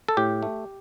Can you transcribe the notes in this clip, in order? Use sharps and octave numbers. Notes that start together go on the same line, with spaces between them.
A4
A2 G4
A3